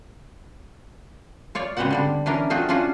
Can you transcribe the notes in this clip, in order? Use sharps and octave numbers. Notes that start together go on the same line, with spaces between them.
F4 C#5 D5
C#3 G#3 B3 C4 F#4 F#5
D3 G3 D4
E3 C#4 D4 A#4
A3 C4 F4 F#4 G#4
C#4 D4 F4 F#4 G#4